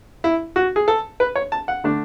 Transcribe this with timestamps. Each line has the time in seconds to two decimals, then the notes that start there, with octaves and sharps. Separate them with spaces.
0.24 E4
0.56 F#4
0.76 G#4
0.88 A4
1.20 B4
1.36 C#5
1.52 A5
1.68 F#5
1.84 D3 A3 D4